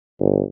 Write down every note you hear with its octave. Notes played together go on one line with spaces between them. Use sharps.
G1